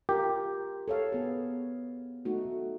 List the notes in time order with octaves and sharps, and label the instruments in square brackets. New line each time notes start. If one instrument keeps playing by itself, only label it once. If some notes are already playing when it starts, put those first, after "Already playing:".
[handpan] F4 A#4 [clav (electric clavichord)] G4
[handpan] A4 C#5 F5
B3 G#4
A3 D#4 F#4